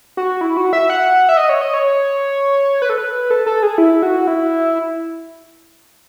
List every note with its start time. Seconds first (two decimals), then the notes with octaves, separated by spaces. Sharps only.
0.17 F#4
0.41 E4
0.57 F#4
0.73 E5
0.90 F#5
1.29 E5
1.37 D#5
1.49 C#5
1.61 D#5
1.74 C#5
2.82 B4
2.89 A4
2.98 B4
3.31 A4
3.46 A4
3.63 G#4
3.78 E4
4.03 F#4
4.27 E4